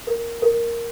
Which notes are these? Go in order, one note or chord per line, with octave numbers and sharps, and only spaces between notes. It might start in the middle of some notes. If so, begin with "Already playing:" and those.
A#4
A#4